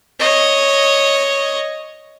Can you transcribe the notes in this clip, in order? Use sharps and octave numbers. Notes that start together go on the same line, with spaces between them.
C#5 D#5